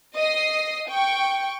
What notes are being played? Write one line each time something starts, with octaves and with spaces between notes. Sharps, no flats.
D#5 D#6 C7
G5 C#6